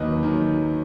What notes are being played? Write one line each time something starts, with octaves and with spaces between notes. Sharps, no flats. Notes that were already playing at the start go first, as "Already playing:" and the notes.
Already playing: D#2 D#3 F#3 B4 D#5
D#3 F#3